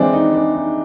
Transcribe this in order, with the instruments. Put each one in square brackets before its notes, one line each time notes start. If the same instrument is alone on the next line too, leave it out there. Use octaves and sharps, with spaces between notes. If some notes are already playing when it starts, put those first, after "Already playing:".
Already playing: [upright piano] E3 G#3 C4 [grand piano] D4
[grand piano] D#4
D4
D#4